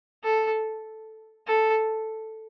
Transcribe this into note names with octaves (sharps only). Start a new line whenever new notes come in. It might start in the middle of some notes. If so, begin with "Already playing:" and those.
A4
A4